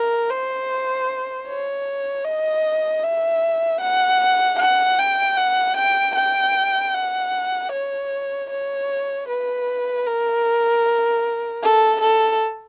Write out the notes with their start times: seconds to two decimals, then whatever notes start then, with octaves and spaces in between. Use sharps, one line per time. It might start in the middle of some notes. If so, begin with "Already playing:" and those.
Already playing: A#4
0.30 C5
1.47 C#5
2.25 D#5
3.03 E5
3.81 F#5
4.59 F#5
4.99 G5
5.37 F#5
5.77 G5
6.16 G5
6.94 F#5
7.72 C#5
8.50 C#5
9.28 B4
10.07 A#4
11.63 A4
12.01 A4